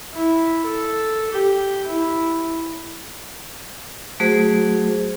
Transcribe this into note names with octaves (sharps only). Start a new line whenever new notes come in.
E4
A4
G4
E4
F#3 A3 F#4 G#4 C5